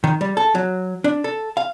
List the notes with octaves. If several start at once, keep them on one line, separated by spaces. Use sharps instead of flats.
D#3
G3
A4
F#3
D4
A4
F5